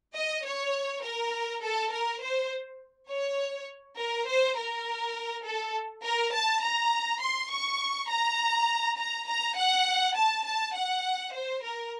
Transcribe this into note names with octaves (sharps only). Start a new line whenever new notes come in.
D#5
C#5
A#4
A4
A#4
C5
C#5
A#4
C5
A#4
A4
A#4
A5
A#5
C6
C#6
A#5
A#5
A#5
F#5
A5
A5
F#5
C5
A#4